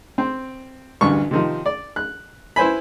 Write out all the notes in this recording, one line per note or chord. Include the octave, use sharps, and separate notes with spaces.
C4
A1 D2 G2 C#6
C3 D#3 F3
D5
F#6
E4 B4 C5 G#5 B5